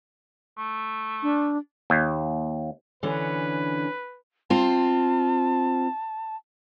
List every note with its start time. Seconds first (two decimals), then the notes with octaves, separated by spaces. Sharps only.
0.57 A3
1.23 D4
1.90 D#2
3.03 D3 E3 C#4 B4
4.50 C4 F4 A5